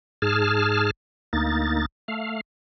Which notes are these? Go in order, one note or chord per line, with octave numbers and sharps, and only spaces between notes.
G#2 G#4 A5 F6
D2 A#3 D#4 A6
A3 F5